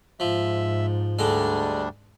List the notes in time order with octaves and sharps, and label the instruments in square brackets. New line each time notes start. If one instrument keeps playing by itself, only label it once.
[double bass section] G#2 [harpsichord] F3 [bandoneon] E5
[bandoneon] D2 G3 D4 [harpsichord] D3 G#3 G#5